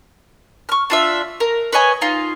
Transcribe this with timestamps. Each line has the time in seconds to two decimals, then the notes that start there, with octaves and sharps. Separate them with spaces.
0.69 C#6 F6
0.90 D4 F4 E5
1.40 A#4
1.72 B4 C#5 D#5 G#5
2.01 D#4 F4